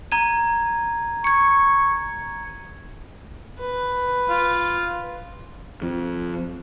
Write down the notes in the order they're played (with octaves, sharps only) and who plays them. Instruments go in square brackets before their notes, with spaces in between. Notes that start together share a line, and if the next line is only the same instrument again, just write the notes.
[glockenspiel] A#5 G#6 D#7
[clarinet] C#6 [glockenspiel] G#6 C#7
[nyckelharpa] B4
[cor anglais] F4
[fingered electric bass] F2